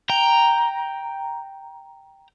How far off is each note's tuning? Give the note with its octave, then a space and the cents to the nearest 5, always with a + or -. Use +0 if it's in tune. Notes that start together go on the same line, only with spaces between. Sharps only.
G5 +0 A#5 +0